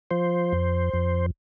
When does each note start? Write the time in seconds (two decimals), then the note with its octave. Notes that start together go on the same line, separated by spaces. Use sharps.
0.11 F3 C5
0.52 F2
0.94 F2